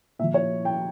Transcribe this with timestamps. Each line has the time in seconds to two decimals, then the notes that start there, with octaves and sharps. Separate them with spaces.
0.19 A#2 E5
0.24 F3
0.34 C#5
0.65 G5